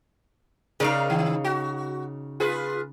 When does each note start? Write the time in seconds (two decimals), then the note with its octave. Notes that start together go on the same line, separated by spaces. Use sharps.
0.80 C#3 D#4 G#4 A#4 D5 F5
1.10 D#3
1.44 F#4
2.40 F4 G#4 B4